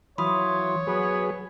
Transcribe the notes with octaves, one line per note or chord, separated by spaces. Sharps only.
E3 F#3 F4 C#5 B5 D#6
F#3 B3 G#4 B4